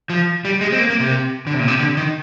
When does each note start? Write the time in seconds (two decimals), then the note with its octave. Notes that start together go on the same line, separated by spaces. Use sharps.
0.10 F3
0.45 G3
0.61 G#3
0.72 C4
0.79 A#3
0.90 A#3
1.00 C3
1.47 D3
1.54 C3
1.60 A#2
1.68 C3
1.79 D3
1.97 D#3